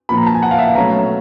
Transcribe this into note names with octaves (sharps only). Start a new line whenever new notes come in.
A#2 F3 A#3 B5
A#5
A5
G#5
F#5
F5
E5
F5
B2 F#3 A3 C#4 A#5